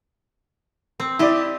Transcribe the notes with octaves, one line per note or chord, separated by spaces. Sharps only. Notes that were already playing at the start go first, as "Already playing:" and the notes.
C4
E4 G4 D5 D#5